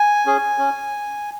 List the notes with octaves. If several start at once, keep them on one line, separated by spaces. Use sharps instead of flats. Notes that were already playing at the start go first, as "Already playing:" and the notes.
Already playing: G#5
C#4 G#4
C#4